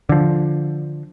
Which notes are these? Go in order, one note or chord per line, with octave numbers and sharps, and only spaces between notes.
D3 F3